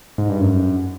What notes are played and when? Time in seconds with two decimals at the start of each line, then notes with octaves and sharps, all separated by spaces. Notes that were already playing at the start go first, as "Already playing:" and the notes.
0.18 G#2
0.29 G2
0.41 F#2